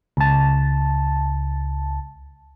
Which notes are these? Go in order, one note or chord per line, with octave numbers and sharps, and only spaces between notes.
C#2 A5